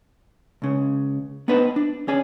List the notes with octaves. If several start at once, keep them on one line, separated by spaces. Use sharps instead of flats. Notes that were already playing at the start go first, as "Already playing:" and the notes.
C#2 C#3
B3 D4 D#4 B4 C5
D4
C#4 G#4 D5 G#5